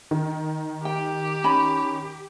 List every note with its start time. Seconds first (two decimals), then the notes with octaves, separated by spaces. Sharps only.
0.11 D#3
0.85 G4 G5
1.44 C#4 D#4 B5